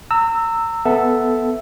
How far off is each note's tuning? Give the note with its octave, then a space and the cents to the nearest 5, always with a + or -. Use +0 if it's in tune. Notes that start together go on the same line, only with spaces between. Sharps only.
A#5 -30 E6 +0
B3 +0 A4 +0 E5 +0